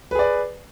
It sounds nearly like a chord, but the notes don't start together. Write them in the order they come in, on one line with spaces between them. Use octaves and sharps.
B4 G#4 D5